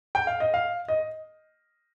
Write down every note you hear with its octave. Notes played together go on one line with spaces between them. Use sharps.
G5
F5
D#5
F5
D#5